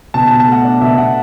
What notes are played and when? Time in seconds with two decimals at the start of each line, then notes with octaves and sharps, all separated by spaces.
0.14 B2 A5
0.27 A5
0.31 B2
0.40 A5
0.48 A3 F#5
0.64 D4
0.81 B2 E5
0.98 B2 F#5